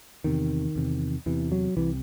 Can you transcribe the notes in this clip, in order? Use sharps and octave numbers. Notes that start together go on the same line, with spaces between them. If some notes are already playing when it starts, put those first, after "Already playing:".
E2 C3 D#3
E2 C3
E2 C3 E3
F#3
C2 C3 E3